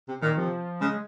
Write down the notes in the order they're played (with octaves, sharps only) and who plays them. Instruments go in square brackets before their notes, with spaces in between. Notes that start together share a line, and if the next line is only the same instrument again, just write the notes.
[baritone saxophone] C3
[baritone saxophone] A#2 [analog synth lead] D#3
[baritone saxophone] C3 [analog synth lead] F3
[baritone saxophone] C#3 [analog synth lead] G#3